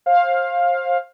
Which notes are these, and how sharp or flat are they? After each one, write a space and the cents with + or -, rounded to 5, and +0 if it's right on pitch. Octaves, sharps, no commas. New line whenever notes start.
C5 +30 F5 +10